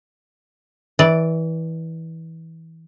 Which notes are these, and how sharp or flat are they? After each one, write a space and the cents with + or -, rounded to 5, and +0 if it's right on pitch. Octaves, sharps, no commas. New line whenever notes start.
E3 -20 D5 +0